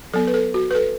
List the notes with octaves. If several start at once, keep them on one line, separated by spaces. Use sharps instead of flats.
F#3 B3 A4
B4
A4
F#4
B4
A4